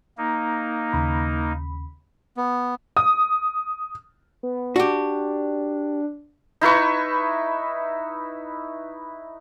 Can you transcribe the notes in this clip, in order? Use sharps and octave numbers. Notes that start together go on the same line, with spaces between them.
A#3 D#4
D#2 C#3 B5
B3
D#6
B3
D4 F#4 G4
D#4 E4 B4 C#6